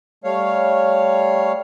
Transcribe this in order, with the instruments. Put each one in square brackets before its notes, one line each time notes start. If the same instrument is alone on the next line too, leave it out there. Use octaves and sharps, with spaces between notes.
[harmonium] G3 A3 C#5 F5